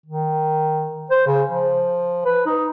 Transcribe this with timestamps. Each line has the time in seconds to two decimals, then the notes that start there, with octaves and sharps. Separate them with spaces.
0.06 D#3
1.10 C5
1.27 C#3
1.50 F3
2.25 B4
2.46 D#4